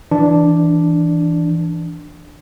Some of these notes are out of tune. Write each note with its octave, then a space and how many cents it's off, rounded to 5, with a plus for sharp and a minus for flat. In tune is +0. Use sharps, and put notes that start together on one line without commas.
E3 +0 D4 +0